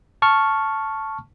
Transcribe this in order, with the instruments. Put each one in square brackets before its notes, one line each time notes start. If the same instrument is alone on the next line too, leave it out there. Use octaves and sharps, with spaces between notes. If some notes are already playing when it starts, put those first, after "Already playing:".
[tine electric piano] A5 C#6 F6